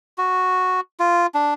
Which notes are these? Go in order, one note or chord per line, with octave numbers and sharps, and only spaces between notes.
F#4
F4
D4